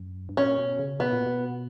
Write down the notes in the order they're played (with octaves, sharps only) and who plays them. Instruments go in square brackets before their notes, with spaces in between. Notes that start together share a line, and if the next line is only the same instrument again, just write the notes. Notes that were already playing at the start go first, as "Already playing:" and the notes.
Already playing: [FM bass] F#2
G2
[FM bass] A#2 [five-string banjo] C#4
[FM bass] B2
C#3
[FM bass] B2 [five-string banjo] B3
[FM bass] A#2
B2